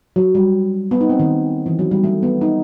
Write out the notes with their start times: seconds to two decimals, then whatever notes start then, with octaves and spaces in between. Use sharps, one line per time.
0.16 F#3
0.35 G3
0.91 B3
1.01 D#4
1.10 C4
1.19 D#3
1.66 E3
1.79 F#3
1.91 G3
2.04 A3
2.23 B3
2.41 D#4